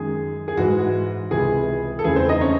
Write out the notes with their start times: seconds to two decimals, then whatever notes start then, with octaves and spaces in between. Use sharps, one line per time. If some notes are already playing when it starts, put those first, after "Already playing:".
Already playing: F#2 D#3 G#3 G#4
0.48 G#4
0.57 G#2 E3 G#3 F#4
1.31 C#2 C3 E3 G#4
1.99 A4
2.04 E2 C#3 E3 A3 G#4
2.16 C4 C5
2.29 D#4 D#5
2.41 C#4 C#5